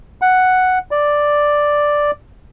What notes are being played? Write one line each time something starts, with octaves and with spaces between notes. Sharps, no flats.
F#5
D5